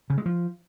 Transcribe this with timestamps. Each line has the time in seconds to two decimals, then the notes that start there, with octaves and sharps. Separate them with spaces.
0.10 C#3
0.18 G#3
0.26 F3